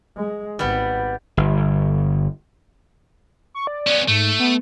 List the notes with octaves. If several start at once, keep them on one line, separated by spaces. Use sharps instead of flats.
G#3
G#1 G3 B3
G1
C#6
D5
B3 C#4
G#2 A3
B3